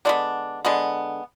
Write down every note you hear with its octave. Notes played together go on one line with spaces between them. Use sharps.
D3 G#3 B3 D4
D3 G#3 B3